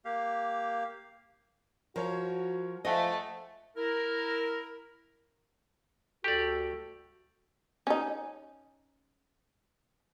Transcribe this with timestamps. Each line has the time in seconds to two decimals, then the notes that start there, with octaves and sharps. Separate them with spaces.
0.05 A#3 G4 F5
1.96 F3 F#4 A#4 C#5
2.85 F3 A3 D#5 E5 F#5 G#5
3.77 E4 A#4
6.24 D2 F#4 G4 A4 D5
7.87 C#4 D#4